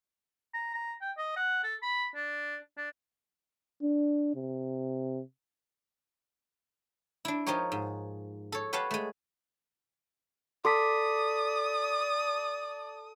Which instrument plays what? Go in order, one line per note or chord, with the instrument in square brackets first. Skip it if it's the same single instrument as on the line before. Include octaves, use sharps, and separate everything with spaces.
[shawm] A#5
A#5
G5
D#5
F#5
A4
B5
D4
D4
[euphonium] D4
C3
[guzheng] D4 E4
F3 D#4 G4 A#4 C#5
G#2
A4 C#5
G4 B4 C#5 F5 F#5 A5
G#3 A3
[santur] A4 [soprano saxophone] D5 [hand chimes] C6 D6 B6 [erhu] D#6